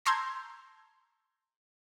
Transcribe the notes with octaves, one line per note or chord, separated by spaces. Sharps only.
A5 A#5 C6 E6 G6 G#6